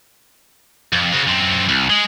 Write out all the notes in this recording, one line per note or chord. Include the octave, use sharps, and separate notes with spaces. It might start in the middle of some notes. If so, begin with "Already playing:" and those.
F2
C#3 F#4
F#2 C4
C2
G#3